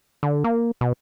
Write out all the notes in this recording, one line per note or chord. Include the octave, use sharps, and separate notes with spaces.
D3
A#3
B2